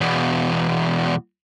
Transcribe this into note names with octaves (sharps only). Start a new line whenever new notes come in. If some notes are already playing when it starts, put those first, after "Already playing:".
E2 B2